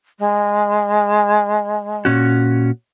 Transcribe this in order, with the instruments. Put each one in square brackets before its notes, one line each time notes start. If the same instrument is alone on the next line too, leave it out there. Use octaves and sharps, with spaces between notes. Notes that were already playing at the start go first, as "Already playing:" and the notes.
[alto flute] G#3
[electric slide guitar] A#2 C#4 F#4